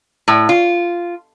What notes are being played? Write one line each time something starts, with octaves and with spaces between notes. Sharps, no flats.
A2
F4